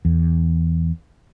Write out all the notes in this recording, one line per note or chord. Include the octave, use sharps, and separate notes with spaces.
E2